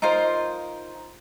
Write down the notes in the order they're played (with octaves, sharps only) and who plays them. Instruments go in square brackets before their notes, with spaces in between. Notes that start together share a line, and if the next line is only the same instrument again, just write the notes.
[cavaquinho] D#4 F4 A#4 C5